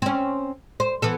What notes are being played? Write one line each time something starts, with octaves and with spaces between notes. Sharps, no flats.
C4 C#4
C5
E3 B3 A4